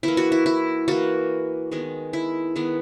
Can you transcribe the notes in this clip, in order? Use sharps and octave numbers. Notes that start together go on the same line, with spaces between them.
E3 A#3 E4
F#4
E4
E4
E3 A#3 F#4
D#3 G#3 B3
E4
D#3 G#3 B3